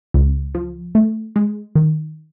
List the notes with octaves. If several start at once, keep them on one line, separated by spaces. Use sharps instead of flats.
C#2
F3
A3
G#3
D#3